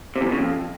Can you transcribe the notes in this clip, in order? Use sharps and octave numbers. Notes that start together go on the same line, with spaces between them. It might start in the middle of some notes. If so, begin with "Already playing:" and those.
C3
E2
B2
C#3
F2